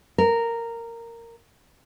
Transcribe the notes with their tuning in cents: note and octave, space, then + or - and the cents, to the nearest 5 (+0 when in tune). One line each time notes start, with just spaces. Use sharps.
A#4 -10